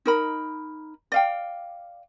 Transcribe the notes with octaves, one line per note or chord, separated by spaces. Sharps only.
D#4 A#4 B5
D5 F5 G5